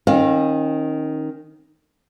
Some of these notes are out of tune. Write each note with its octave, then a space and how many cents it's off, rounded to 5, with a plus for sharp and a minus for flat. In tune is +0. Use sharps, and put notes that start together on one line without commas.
D#3 +0 C#4 -40 F5 +5